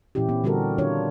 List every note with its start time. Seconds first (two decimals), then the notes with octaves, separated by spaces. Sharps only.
0.15 A#2 E3 C#4 E4 G4
0.29 B3 C4
0.44 D3 G3 F#4 G4 A4 A#4
0.78 D#3 D4 F4 C#5